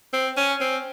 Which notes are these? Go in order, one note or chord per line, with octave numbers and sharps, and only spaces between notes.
C4
C#4
C4